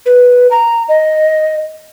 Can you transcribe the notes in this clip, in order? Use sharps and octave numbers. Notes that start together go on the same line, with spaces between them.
B4
A#5
D#5